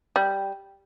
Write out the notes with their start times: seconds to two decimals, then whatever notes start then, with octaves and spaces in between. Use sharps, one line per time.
0.16 G3